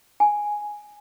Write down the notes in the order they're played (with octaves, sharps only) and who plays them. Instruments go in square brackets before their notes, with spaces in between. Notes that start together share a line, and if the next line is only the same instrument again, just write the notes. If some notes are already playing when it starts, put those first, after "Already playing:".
[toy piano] G#5